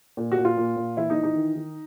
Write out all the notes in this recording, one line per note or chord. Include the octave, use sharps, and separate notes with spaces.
A#2
F#4
A#2
F4
A#2
A#2
E3 E4
D#4
E3
D#4
D#3
D#3